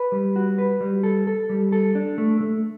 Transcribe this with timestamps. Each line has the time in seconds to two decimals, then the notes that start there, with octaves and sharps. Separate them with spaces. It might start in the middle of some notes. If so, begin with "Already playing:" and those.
Already playing: B4
0.12 G3
0.36 F#4
0.58 B4
0.81 G3
1.03 A4
1.27 A4
1.50 G3
1.72 A4
1.95 D4
2.18 A3
2.41 A3